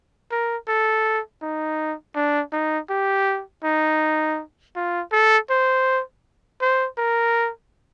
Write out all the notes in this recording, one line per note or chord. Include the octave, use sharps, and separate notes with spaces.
A#4
A4
D#4
D4
D#4
G4
D#4
F4
A4
C5
C5
A#4